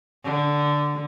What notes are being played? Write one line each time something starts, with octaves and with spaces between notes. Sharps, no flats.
D3